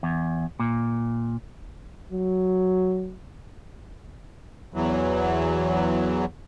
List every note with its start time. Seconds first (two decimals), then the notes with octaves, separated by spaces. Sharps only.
0.03 E2
0.59 A#2
2.12 F#3
4.74 E2 E3 F#3